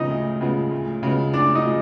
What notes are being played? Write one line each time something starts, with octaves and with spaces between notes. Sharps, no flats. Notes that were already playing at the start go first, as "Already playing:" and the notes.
Already playing: C#3 F3 G#3 B3 D#4
D2
C#3 F3 G#3 B3
D2
C#3 F3 G#3 B3
D2 D4
D#4
C#3 F3 G#3